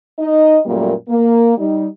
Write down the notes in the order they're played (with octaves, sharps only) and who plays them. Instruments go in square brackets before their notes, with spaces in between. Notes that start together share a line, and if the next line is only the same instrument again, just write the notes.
[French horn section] D#4 D#5
F#2 A#2 G3 A3 A#3
A#3
G3 D#4